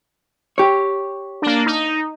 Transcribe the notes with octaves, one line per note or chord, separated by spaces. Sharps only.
G4 C#5
A#3 D4
D#4